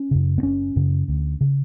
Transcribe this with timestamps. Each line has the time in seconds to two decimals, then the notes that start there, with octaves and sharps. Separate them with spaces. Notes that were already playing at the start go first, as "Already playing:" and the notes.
Already playing: C#4
0.11 F#2 C#3
0.38 B3
0.43 F#1 C#4
0.76 F#2 C#3
1.08 D2
1.41 C#3